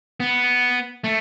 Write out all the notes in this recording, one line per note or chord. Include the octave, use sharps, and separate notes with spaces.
B3
A3